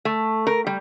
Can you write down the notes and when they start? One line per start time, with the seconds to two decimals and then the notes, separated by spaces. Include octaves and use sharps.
0.05 A3
0.47 A#4
0.67 G3